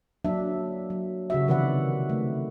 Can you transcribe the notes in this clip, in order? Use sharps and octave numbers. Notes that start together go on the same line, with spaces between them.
F#3 A#3 D4 E5
F#3
C#3 F#4 E5
C3 D#3 E3 B4 D5 F#5
A3